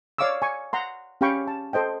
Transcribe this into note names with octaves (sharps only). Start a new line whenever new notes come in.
C#5 D5 F5 C#6 D6 E6
G#5 C#6
F#5 A#5 C6
C#4 G4 F5 G5 B5 C#6
A5
A4 C5 D#5 G5